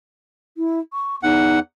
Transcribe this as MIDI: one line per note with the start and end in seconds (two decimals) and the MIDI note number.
0.57 0.79 64
0.93 1.16 85
1.23 1.60 40
1.23 1.57 63
1.23 1.60 78